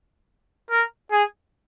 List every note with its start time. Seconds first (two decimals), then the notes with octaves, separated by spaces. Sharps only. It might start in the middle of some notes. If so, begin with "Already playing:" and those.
0.70 A#4
1.11 G#4